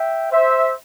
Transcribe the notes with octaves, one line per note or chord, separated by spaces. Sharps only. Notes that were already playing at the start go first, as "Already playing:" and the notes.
Already playing: E5 G5
C5 E5